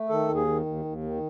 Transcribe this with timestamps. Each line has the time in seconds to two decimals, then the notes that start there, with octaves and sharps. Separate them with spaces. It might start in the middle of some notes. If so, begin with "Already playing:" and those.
Already playing: A3
0.09 D#3 A4
0.29 D#2
0.35 G#4
0.47 D#3
0.66 D#2
0.85 D#2
1.04 D#3